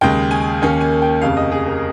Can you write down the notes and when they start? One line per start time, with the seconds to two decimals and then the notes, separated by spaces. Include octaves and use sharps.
0.01 D#2 C#3 G#3 G5
0.31 G#5
0.61 D#2 D#3 A#3 C#4 G#5
0.81 G#5
1.02 G5
1.21 F1 F2 C#3 F5
1.37 D#5
1.52 G#4
1.66 A#4